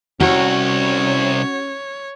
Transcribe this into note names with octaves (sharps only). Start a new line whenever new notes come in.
C2 C#4 F#4 C#5